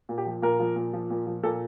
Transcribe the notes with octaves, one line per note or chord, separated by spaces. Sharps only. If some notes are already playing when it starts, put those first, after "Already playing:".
A#2
G4
F3
A#2 A#4
F3
A#2
F3
A#2
F3
A#2 A4